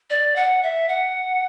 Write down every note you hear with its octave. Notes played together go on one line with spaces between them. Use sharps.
D5
F#5
E5
F#5